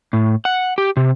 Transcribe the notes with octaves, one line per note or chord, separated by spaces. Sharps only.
A2
F#5
G4
C3